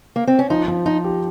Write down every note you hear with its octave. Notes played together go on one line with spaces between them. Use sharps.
A#3
C4
C#4
F3 D#4
F3
F3 D#4
G4